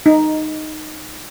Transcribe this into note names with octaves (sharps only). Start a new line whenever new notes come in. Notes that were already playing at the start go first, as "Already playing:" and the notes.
D#4